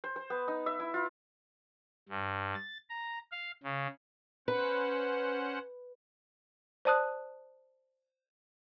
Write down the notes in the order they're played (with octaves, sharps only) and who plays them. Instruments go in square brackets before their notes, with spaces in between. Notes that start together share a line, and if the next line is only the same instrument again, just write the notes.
[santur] C5
C5
B3
D#4
E5
E4
F4
[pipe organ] G2
A6
A#5
F5
C#3
[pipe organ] C#4 C5 F#5 [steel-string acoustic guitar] B4
[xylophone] C5 D5 A5 D#6 F#6